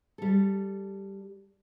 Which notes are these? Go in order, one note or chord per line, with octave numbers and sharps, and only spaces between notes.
G3 A4